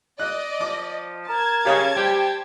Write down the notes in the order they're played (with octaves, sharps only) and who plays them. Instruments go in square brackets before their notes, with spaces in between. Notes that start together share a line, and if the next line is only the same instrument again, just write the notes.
[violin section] D5 D#5 [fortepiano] F#6
[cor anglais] F3 [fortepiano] D6
[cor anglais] A#4 [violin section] A5 G#6
[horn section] C#3 [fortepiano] G4 C#5 D#5
[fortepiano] G3 [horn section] G4 [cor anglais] C5